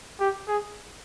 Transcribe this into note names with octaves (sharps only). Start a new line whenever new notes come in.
G4
G#4